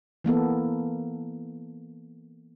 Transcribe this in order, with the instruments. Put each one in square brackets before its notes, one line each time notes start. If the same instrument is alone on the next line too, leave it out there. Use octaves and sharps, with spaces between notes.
[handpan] E3 A#3 B3 A4